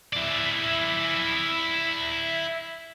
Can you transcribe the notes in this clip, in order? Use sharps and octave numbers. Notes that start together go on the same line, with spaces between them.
E4 D5